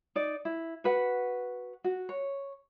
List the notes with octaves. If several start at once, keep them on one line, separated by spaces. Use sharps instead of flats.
D#4 D5
E4
F#4 B4 F#5
F#4
C#5